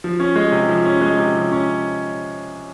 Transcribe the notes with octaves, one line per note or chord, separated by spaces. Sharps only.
F3
C#4
G#3
C3
F3
C#4
G#3
C3
F3
C#4